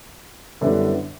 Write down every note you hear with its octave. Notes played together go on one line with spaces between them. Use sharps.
F#2 D3 G3 B3 E4